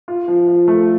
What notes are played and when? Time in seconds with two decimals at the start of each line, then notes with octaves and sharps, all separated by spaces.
0.08 F4
0.28 F3
0.47 F3
0.68 A3